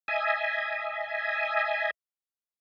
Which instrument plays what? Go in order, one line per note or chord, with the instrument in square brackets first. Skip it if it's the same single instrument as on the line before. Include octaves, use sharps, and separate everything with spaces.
[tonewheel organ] D#5 E5 G#5